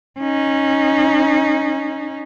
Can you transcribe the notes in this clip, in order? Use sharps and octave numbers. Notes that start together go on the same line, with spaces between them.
C#4 D#4